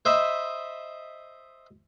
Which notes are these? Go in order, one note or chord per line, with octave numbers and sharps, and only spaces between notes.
C5 D#5 E5 B5